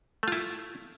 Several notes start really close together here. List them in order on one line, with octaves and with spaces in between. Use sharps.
A3 F4 E4